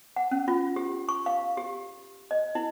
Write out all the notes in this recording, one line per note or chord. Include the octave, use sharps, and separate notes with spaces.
F#5
C#4
F4
G4
C#6
F5
G4
D#5
E4